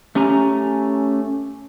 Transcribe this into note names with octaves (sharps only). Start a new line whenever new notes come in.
A3 C#4 G4 G#5 A#5